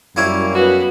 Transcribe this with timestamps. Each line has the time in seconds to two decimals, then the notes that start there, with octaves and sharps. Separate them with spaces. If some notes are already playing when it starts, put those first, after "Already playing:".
0.16 F#2 G3 A#3 E4 C#5
0.55 B3 F#4